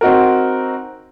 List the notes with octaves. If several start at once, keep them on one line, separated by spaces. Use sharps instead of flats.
C4 D#4 F#4 A#4